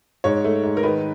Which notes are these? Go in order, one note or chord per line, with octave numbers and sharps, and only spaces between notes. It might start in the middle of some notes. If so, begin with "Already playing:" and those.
G#2 C#5
A3
G#2
A#4
D#3 B4